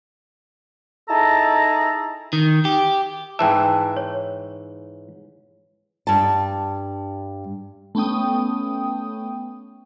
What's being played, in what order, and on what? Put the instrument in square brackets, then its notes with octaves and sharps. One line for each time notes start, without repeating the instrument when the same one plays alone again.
[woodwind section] D#4 E4 G#4 A4 A5 A#5
[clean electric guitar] D#3
G4
[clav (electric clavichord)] G#2 E3 E5 [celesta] G5 A5
[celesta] C#5
[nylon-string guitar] G2 A5
[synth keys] A3 B3 C#4 G5 D#6